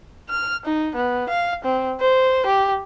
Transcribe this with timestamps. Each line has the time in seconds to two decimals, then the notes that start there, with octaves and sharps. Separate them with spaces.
0.29 F6
0.65 D#4
0.95 B3
1.29 F5
1.64 C4
2.00 C5
2.46 G4